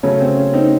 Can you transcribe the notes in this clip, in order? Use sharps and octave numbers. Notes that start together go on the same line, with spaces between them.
C#3 F#3 A3 C#4
C4
C#4
C4 D#4